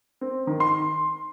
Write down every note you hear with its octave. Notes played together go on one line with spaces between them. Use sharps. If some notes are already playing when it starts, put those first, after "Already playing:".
C4
D#3
C6